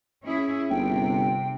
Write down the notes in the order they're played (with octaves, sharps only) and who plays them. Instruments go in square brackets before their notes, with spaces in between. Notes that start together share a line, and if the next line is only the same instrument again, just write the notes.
[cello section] C#4 E4 G#4
[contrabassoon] G1 [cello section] C3 [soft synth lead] G5